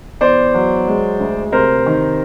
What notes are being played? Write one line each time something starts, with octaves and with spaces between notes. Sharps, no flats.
E2 C5 D5
F#3
G#3
D2
C3 A#4 C5
D#3